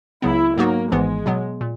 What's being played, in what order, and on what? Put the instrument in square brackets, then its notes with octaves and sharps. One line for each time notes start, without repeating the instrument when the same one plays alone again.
[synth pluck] C#2 C#3 F#3 B3 [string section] E4
[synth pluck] G#2 F#3 B3 D#4 F#4 [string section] A#3
[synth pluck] G#1 G#2 E3 B3 [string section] G#3
[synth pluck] B2 F#3 B3
A#2